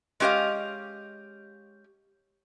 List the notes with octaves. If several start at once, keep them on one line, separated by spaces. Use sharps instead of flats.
G#3 C#4 G4 D5 D#5 F5